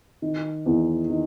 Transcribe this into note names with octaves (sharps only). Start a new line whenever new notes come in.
D#3
E2
D#3